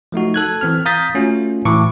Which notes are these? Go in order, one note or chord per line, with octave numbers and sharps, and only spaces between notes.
F3 A3 D#4 F#4
A4 F#6 G#6
E3 C4 F6
F5 A#5 D#6 G6 A6 B6
A3 C#4 F4 F#4
A2 E3 B4 C#6 D6